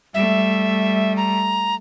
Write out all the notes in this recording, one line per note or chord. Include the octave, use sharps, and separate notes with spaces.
G3 A3 E5
A#5